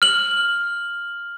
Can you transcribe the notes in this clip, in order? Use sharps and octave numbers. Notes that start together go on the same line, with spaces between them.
F6 F#7